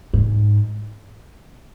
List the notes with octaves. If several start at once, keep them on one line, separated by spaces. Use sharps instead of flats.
G#2